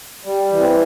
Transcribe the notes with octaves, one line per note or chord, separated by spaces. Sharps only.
G3
E3
C4